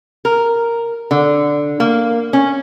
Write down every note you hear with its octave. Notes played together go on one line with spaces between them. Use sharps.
A#4
D3
A#3
C#4